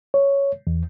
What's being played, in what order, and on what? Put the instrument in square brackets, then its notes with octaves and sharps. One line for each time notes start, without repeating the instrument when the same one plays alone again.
[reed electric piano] C#5
E2